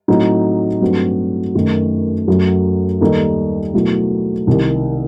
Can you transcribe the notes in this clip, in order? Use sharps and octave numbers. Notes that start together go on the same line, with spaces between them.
A2 F#3 A3 C4 D#4
G2 F#3 A3 C4 F#4
F#2 D#3 A3
F#2 F#3 A3
D#2 D#3 G3 D#4 A4
B2 F#3 A3 E4
C2 C3 D#3